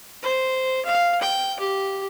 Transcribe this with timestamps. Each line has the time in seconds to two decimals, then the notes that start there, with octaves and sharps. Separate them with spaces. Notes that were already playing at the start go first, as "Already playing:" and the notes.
0.23 C5
0.85 F5
1.21 G5
1.60 G4